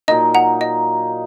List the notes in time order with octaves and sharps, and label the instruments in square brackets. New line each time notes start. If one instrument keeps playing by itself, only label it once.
[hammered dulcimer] A#2 F#3 A#3 D#4 [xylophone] D#5
[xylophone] F#5 A#5
D#5